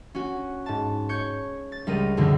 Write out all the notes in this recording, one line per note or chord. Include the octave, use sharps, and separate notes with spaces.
C#4 F#4
G#2 A5
C#5 C#6 G6 G#6 C#7
A6
C#2 G3 A#4 D#7
C#2 F#2 B2 D3 E3 C4